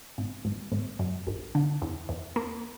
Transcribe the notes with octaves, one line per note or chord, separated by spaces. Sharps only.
G#1
G#1
G#1
F#2
G#1
D3
E2
E2
A#3